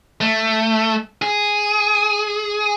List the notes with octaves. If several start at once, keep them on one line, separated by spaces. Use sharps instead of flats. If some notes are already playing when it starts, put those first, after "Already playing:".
A3
G#4